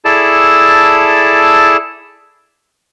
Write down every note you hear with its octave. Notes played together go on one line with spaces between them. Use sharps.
E4 G#4 A4 D5 A5